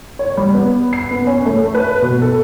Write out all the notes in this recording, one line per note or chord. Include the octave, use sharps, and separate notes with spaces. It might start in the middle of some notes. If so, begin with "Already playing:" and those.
C#5
G3
B3
C7
B3
C#4
A3
B4
B2
A4